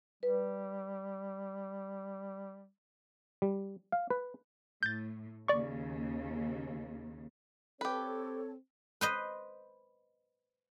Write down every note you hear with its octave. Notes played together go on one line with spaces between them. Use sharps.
G3 B4
G3
F5
B4
A2 G6 A6
D#2 C#3 D5 C#6
C4 G4 A4 B4 C#5
B4 C5 D#5